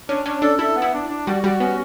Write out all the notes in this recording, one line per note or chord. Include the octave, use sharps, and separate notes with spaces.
C#4 D4
C#4 D4
D4 A4
E4 A4
B3
E4
D4
D4
G3 F#4
G3 F#4
B3 C#4